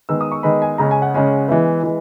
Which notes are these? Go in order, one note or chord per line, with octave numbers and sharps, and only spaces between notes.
D#3 G#3 B3 E6
D#6
C#6
D#3 G#3 B3 B5
G#5
C#3 G#3 C#4 A#5
G#5
F#5
C#3 G#3 C#4
E3 G#3 B3 E5
E3 G#3